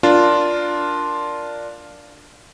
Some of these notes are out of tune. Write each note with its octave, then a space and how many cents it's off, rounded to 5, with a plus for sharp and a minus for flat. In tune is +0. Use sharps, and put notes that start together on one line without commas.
D4 +0 F4 +0 A#4 +0